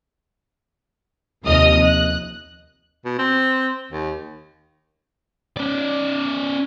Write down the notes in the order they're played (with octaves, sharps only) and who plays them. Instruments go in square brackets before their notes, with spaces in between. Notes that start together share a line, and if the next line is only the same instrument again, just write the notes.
[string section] D#2 C3 F3 D#5 D#6 F6
F#6
[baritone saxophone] B2
C4
D#2
[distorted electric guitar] C#4 D5